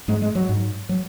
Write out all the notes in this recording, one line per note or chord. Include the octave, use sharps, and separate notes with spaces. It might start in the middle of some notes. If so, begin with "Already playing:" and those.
G#2 G#3
G#3
F#3
G#2
F#3